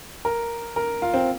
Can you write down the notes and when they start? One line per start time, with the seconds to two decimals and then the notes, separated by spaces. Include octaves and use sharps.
0.25 A#4
0.76 A#4
1.02 F4
1.14 C4